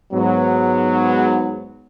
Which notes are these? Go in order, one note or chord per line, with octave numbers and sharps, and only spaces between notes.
G#2 F#3 B3